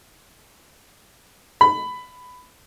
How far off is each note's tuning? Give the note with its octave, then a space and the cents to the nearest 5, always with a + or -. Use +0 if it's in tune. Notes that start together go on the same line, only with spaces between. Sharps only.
B5 +15